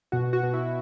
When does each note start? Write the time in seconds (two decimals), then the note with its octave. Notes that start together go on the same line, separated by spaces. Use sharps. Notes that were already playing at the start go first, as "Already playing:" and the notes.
0.12 B2 F#4
0.33 F#4
0.43 B2
0.53 E4